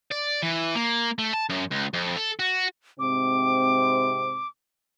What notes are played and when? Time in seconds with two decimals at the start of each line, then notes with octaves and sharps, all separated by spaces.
0.11 D5
0.42 E3
0.75 A#3
1.19 A3
1.33 A5
1.50 F#2
1.71 C#2
1.94 F2
2.17 A4
2.39 F#4
2.99 G#2 C3 C4 D6